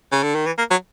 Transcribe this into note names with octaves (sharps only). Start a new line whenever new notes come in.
C#3
D3
D#3
E3
A#3
F#3